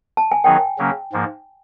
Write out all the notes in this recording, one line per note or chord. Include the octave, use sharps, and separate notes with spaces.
A5
G#5
D#3 F#3 B3 D#4 G#4 G5
C#3 F#3 A#3 C#4
G#2 F3 A#3